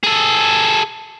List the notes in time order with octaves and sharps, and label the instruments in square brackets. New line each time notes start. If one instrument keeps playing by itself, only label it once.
[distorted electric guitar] G#4 A4